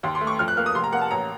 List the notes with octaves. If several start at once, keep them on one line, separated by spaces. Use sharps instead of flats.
D#2 C6
C6
A3
C#6
F2 F6
F#6
A#3 F6
D#6
F1 C6
A#5
A#3 F#5
A5
A1 A#5